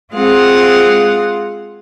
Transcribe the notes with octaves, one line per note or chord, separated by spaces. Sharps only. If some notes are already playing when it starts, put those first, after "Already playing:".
G#3 C4 F4 G#4 F5 F#5